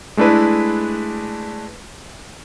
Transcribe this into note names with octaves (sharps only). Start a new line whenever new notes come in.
G#3 A3 D4 E4 B4